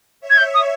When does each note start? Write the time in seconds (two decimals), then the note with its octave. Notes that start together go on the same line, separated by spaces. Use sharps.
0.21 C#5 E5
0.30 G#6
0.38 G6
0.54 D#6